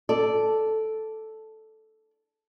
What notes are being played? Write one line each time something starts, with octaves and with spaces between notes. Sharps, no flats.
A4 D5